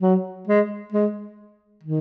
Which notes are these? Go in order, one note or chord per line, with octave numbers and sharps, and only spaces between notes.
F#3
G#3
G#3
D#3